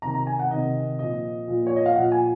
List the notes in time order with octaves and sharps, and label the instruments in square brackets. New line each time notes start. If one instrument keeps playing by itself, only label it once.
[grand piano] C3 D#3 A#5
A#5
G#5
F#5
C3 D#3 D#5
A#2 F3 D#5
A#2 F3
C#5
D#5
F5
A#2 F3 F#5
G#5